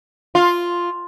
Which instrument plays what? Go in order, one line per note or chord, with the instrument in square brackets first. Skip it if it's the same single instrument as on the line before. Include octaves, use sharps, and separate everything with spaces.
[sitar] F4